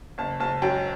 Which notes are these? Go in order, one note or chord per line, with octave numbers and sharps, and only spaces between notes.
F#1 A5
F#1 A5
F#2 G5